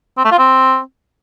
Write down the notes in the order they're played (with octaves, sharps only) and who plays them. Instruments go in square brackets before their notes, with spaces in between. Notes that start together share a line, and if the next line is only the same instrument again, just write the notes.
[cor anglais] C4
A3
F4
C4